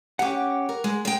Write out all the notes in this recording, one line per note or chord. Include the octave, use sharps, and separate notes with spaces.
C#4 G4 F#5 D6
A#4
G#3
G#3 G5